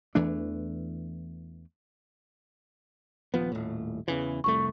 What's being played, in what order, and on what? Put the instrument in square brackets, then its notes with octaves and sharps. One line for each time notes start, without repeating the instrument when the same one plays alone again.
[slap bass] E2 E3 A3 D4
[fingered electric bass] D#1 F3 B3
D#1 A2
E2 C#3 E3
[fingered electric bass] F1 C2 A3 [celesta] C#6